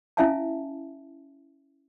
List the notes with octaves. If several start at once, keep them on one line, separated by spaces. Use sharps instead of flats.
C#4 E4 E5 F5 G#5 A5